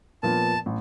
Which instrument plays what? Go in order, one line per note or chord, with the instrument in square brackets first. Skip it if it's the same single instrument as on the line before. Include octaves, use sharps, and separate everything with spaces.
[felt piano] A#2 F3 B3 [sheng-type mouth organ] A5
[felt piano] A1